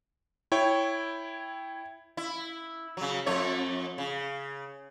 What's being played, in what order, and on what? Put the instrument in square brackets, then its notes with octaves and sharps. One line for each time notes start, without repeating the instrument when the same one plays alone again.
[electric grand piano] E4 C#5 G5
[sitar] E4
C#3 F#3
F2 A3 C#5
C#3